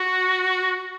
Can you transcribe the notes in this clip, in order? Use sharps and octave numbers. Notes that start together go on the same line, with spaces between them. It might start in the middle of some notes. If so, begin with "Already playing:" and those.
Already playing: F#4